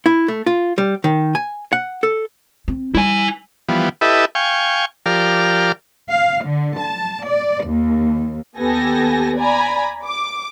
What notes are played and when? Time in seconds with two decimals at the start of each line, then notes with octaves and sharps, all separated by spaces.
0.06 E4
0.28 A3
0.46 F4
0.78 G3
1.04 D#3
1.35 G#5
1.73 F#5
2.03 A4
2.68 C4
2.95 G3 E4 G#5
3.69 E3 F3 G3 B3
4.01 E4 G4 A4 B4 D#5 E5
4.35 F5 G5 G#5 C#6
5.06 F3 G4 A#4 D5 F6
6.09 F5
6.47 D3
6.79 A5
7.26 D5
7.65 D#2
8.57 D#2 B3 G4 A4 G#5 A#6
9.37 D5 G#5 A#5 B5
10.05 D6